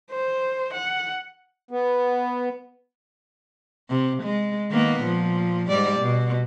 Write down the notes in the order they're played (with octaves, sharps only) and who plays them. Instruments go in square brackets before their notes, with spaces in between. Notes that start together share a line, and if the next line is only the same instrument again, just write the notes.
[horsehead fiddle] C5
F#5
[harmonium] B3
[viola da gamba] C3
G#3
D#3 A#3 B3
A#2 F3
G#2 G3 D5
B2